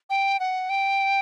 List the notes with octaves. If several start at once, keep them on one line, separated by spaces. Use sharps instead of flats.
G5
F#5
G5